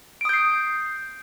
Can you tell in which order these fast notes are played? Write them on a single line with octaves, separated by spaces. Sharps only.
D7 D#6 G6 C7